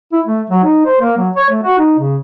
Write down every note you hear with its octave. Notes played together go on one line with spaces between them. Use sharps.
E4
A3
F#3
D#4
C5
A#3
F#3
C#5
A3
F#4
D#4
C#3